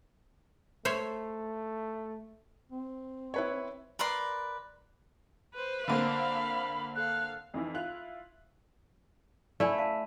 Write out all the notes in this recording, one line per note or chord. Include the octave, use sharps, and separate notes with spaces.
A3 C5 C#5 E5
C4
E4 B4 C#5
A#4 B4 D5 C6
B4 C5
D3 A#3 C4 F5 B5
A4 F5 F#6
F2 E3 D#4 E4
E4 F4 F#6 F7
A3 E4 D5 G#5
F5 A5